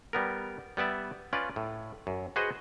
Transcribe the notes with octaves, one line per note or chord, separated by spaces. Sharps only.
G3 B3 A#4
G3 B3 D5 E5
C#4 F4 B4 D5
A2
F#2
F#4 G#4 B4 C5 D#5 F#5